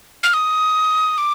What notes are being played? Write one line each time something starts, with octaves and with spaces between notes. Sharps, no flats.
F6
D#6
D6